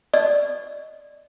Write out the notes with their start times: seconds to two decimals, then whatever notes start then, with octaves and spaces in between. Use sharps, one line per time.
0.14 D5 D#5